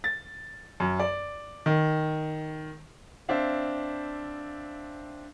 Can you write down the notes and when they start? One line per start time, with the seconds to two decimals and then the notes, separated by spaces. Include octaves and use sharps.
0.04 A6
0.80 F#2
1.00 D5
1.66 D#3
3.29 C4 D4 C5 E5 F5